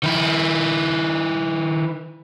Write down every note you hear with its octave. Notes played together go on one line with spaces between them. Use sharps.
D#3 E4